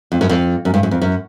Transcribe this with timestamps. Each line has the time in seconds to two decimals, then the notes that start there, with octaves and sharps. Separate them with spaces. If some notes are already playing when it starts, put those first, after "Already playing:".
0.12 F2
0.21 F#2
0.29 F2
0.65 F#2
0.74 G2
0.83 F#2
0.91 F2
1.02 F#2